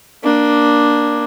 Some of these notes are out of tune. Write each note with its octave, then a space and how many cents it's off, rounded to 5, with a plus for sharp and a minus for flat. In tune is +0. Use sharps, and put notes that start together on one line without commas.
A#3 +15 D4 +0